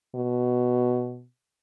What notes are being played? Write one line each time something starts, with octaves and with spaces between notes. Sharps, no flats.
B2